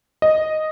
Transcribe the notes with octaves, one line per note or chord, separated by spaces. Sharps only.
D#5